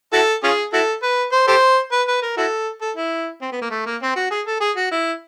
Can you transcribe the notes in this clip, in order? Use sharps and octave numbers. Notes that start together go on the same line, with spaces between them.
E4 F#4 A4
C#4 F4 G#4
E4 F#4 A4
B4
C5
G4 A4 C5
B4
B4
A#4
E4 F#4 A4
A4
E4
C4
B3
A#3
A3
A#3
C4
F#4
G#4
A4
G#4
F#4
E4